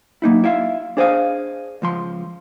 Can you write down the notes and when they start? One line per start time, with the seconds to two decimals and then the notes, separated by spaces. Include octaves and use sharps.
0.22 F#3 A#3 D#4 E4
0.44 E4 E5 F5
0.97 D4 G#4 C5 D5 D#5 F5
1.82 C#2 F3 C6